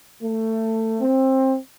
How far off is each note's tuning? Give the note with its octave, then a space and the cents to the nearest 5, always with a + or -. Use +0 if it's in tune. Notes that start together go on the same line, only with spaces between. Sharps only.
A3 +20
C4 +20